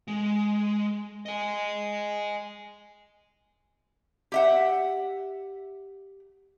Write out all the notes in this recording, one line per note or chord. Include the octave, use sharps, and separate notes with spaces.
G#3
D#5 G#5
G4 E5 F#5